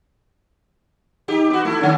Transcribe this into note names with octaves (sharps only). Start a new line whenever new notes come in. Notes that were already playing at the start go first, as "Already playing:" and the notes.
D#4 G4
B3 F#4
A3 E4
D3 C#4